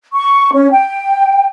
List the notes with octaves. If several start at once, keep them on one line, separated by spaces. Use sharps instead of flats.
C#6
C#4
G5